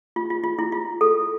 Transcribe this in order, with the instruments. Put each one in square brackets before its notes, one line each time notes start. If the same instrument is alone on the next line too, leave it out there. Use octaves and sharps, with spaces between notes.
[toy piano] F4
F4
F4
E4
F4
A4